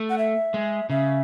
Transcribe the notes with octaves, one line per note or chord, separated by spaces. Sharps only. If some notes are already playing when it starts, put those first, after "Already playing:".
Already playing: A3
F#5
E5
G#3
C#3 E5